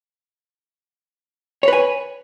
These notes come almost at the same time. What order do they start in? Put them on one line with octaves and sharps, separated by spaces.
C#5 B4 G#5